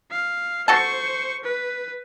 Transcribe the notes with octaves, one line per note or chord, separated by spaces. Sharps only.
F5
F#4 A4 C5 A5 C#6
B4